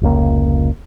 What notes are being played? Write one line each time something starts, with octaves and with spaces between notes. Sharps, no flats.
F1 C#2 A#3